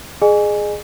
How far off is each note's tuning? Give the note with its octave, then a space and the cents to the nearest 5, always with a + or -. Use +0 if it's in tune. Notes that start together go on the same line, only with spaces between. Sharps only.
G#4 +5 D#5 -40 G#5 +0